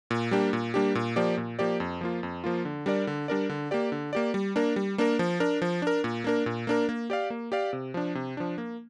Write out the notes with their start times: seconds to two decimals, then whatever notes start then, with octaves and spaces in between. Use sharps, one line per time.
0.11 A#2
0.31 G3 A#3 D4 G4
0.53 A#2
0.74 G3 A#3 D4 G4
0.95 A#2
1.16 F3 A#3 G4 D5
1.37 A#2
1.59 F3 A#3 G4 D5
1.80 F2
2.01 F3 A#3 F4
2.23 F2
2.44 F3 A#3 F4
2.65 D3
2.86 G3 D4 A#4 D5
3.07 D3
3.28 G3 D4 A#4 D5
3.49 D3
3.71 A#3 G4 D5
3.92 D3
4.13 A#3 G4 D5
4.34 G3
4.56 A#3 D4 A#4
4.76 G3
4.98 A#3 D4 A#4
5.19 F3
5.40 D4 A#4
5.62 F3
5.82 D4 A#4
6.04 A#2
6.24 A#3 D4 A#4
6.46 A#2
6.67 A#3 D4 A#4
6.89 A#3
7.10 G4 D5 F5
7.30 A#3
7.52 G4 D5 F5
7.73 C3
7.94 F3 D4
8.15 C3
8.37 F3 D4
8.58 A#3